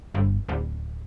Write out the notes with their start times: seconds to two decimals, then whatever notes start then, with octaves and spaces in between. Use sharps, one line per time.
0.14 G1
0.49 D1